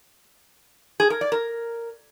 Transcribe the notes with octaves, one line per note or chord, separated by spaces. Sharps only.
G#4
A#4
D5
A#4